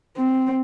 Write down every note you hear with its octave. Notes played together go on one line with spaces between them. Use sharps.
C4